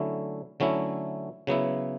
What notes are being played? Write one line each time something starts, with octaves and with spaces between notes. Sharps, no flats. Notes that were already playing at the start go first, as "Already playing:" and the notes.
Already playing: D3 F#3 A3 C#4 E4
D3 F#3 A3 C#4 E4
C#3 F#3 B3 E4